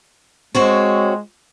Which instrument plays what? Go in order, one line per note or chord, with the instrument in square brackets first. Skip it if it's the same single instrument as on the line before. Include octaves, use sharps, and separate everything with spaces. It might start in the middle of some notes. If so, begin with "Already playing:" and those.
[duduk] G#3 [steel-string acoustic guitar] C4 F#4 C#5